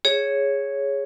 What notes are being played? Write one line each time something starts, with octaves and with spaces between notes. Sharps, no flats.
G#4 C#5